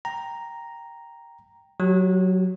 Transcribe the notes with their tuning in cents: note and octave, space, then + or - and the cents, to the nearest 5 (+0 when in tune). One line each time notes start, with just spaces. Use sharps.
G5 +0 A#5 +0
F#3 +0 G4 -30